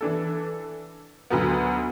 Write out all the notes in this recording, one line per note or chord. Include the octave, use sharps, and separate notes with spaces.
E3 D4 A4
D2 D3 F#3 B3